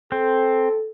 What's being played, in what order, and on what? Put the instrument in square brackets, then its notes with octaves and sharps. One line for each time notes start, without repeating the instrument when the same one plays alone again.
[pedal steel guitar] C4 [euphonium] A4